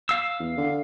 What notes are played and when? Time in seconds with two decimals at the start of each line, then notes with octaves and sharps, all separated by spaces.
0.09 F5 E6
0.39 E2
0.57 D3